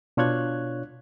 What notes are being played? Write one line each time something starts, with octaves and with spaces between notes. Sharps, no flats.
B2 D4 F4 C#5 F#6 G#6